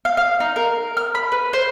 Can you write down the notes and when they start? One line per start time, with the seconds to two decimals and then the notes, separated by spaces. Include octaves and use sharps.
0.05 F5
0.17 F5
0.40 D#4
0.56 A#4
0.97 F6
1.15 B5
1.32 B4
1.53 C5